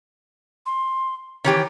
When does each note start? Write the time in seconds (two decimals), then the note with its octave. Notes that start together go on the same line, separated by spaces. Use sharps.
0.66 C6
1.44 D#3 E3 G4 C#5